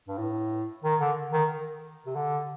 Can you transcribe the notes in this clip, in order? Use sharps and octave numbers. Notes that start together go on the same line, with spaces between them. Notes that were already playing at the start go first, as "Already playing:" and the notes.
G2
A2
D#3
D3
D#3
C3
D3